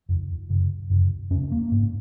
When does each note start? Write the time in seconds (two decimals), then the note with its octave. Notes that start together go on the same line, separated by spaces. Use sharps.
0.09 F2 C#3
0.50 F#2 C#3
0.90 F#2 C#3
1.30 F2 C#4
1.35 C#3
1.52 A#3
1.72 G#2